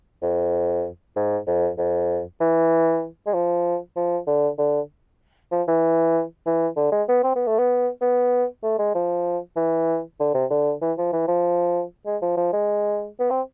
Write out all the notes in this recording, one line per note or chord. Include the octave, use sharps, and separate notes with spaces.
F2
G#2
F2
F2
E3
G#3
F3
F3
D3
D3
F3
E3
E3
D3
G#3
B3
C4
B3
A3
B3
B3
A3
G#3
F3
E3
D3
C3
D3
E3
F3
E3
F3
G#3
F3
F3
G#3
B3
C4